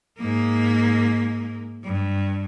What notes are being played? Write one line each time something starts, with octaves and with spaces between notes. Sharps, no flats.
G#2 A#3
G2